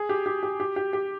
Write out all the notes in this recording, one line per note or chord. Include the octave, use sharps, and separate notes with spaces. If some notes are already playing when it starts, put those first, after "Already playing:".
Already playing: G#4
G4
G4
G4
G4
G4
G4